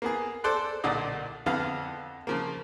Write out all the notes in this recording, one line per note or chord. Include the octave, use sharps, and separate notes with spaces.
A#3 B3 G#4
A4 C5 D5 C6 F#6
B1 A#2 D3 D5 D#5
F2 D3 B3 F5
C#3 F3 A#3